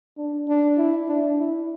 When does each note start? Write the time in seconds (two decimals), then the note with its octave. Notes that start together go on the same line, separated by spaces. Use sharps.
0.17 D4
0.48 D4
0.77 E4
1.08 D4
1.39 E4